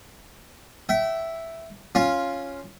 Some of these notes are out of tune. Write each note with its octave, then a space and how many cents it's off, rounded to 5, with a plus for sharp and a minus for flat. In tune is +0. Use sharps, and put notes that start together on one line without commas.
E5 +0 G5 -35
C#4 +0 F4 +0